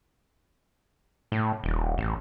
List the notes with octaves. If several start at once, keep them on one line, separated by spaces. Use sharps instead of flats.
A2
D#1
A1